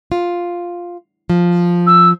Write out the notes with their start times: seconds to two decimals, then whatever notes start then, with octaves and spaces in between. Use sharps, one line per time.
0.12 F4
1.30 F3
1.86 E6